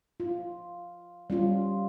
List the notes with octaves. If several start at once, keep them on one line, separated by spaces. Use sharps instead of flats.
F4
G3 C#4 F4